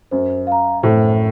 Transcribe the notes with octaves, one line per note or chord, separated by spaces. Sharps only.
F#2 C5
F5 A#5
A2 C5